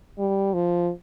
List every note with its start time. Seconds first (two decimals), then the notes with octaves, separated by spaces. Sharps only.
0.18 G3
0.54 F3